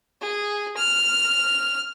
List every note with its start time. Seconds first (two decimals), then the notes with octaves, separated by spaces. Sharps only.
0.21 G#4
0.77 F6